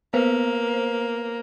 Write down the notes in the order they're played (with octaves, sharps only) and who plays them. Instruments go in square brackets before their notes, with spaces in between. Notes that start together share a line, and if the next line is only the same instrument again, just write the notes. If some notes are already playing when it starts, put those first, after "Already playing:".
[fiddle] A#3 [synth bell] B3 B4 C5